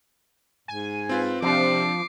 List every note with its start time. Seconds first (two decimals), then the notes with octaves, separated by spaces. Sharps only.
0.68 G#2 G#5
1.09 C4 F4 B4
1.42 C3 F3 C4 D4 D6 C7